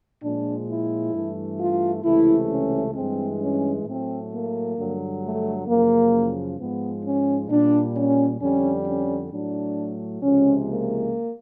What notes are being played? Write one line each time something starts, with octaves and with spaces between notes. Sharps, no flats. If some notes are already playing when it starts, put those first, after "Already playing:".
A#2 F3 G#3 D4
E4
G2 E3 A3
F4
C#2 C3 E3 A3 E4
C#4
G2 E3 G#3 C4
C#4
A2 F#3 A3 C4
A#3
G2 D3 F#3
A3
F#2 C#3 F3 A#3
G#2 F3 G#3 B3
C#4
A#2 G3 D4
C#4
F2 D3 G3 C#4
C#4
A2 F#3 A3 D4
C#2 C3 F3 G#3 C#4
A#3